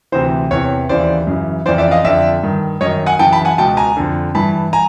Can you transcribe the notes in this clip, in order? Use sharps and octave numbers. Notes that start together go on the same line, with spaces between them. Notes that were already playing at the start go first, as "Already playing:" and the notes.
D2 C3 E3 C5
E2 C3 E3 C#5
D#2 C#3 E3 C5 D5
F#2 C#3 E3
F2 C#3 E3 C5 D5
D5 E5
D#5 F5
F2 D3 D5 E5
G2 D#3
F#2 D#3 C#5 D#5
F#5 G#5
F#2 C#3 E3 G5 A5
A5 B5
F#5 G#5
C#2 B2 G5 A5
G#5 A#5
F2 D3
G2 E3 A5 B5
G#5 A#5